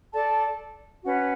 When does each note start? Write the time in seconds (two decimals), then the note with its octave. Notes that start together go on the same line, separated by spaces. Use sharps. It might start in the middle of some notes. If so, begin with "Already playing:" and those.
0.13 A4 D5 A5
1.02 C#4 F#4 B4 F#5